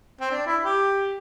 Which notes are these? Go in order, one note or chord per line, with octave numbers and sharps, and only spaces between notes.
C4
D4
E4
G4